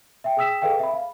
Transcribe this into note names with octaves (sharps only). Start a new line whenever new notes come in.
E5 G5
G#4 G5 D#6 E6 B6 E7
G#4 A4 B4 D#5 F5 G5
E5 B5
F5